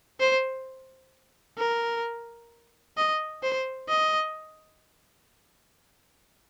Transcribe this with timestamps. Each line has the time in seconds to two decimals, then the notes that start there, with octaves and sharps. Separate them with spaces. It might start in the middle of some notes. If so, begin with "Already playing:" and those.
0.20 C5
1.58 A#4
2.97 D#5
3.43 C5
3.88 D#5